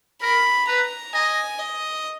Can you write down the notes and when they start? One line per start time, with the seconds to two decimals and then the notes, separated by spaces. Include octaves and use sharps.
0.22 A#4 B5
0.68 B4 A#5
1.13 D#5 G#5
1.59 D#5